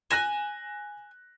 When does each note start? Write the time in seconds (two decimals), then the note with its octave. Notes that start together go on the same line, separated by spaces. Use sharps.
0.11 G#5 F#6 A#6 E7